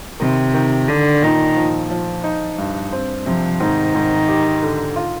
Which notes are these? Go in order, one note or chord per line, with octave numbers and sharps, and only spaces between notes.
C3 D#3
D#3
D3 D4
A#2 D#3
F3
F3
D#4
G2
C4
C3 F3
G#2 D#3
G#2
G4
D3
F4